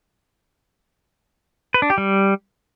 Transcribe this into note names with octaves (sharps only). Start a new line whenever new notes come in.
B4
D4
G4
G3